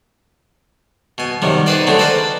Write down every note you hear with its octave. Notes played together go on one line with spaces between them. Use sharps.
B2 G#5
C3 D#3 F#3 G3
D#4 G#4 B4 C5 D5 A#5
D3 F#3 G#3 A3 C4 D4
B4 C5 D5 F5 A#5 B5